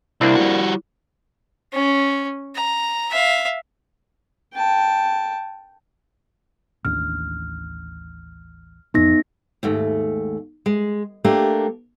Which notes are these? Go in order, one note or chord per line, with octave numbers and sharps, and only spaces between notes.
C2 A#3 C4 D4 E4
G3 F#4
C#4
A#5
E5 F5
G5 A5
A1 D#2 D4 F6
A1 F2 B3 D#4 A#6
D#2 G#2 A3
G#3
A3 A#3 D4 G4